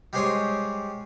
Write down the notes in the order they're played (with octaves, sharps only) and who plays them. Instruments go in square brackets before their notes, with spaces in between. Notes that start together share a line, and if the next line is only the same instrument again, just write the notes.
[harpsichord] G3 G#3 G4 C5 C#5 D#6